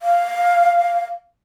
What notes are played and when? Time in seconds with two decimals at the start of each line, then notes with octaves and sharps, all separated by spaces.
0.01 F5